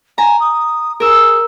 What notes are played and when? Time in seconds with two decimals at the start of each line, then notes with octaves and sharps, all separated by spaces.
0.18 G#5 A#5
0.40 D#6
1.00 G#4 A#4 E6